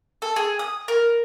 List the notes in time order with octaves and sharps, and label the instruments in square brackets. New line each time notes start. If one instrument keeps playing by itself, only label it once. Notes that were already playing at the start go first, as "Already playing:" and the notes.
[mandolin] A4
G#4
D#6
A#4